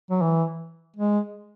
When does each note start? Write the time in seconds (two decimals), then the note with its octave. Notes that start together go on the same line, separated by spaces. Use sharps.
0.11 F#3
0.21 E3
0.96 G#3